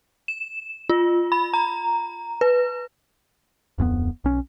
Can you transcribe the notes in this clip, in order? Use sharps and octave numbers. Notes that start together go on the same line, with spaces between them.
E7
F4
B5
A#5
B4
D1 F2 F3 B3
B1 C#4